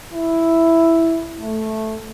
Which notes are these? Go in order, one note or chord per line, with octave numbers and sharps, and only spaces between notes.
E4
A3